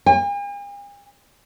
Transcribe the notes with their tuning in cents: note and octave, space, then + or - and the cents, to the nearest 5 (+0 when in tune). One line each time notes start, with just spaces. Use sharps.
G#5 -45